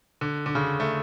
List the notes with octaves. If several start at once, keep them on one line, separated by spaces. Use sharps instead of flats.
D3
D3
C#3
A3